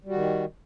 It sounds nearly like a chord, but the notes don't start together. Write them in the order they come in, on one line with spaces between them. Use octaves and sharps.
G3 F#4 D#3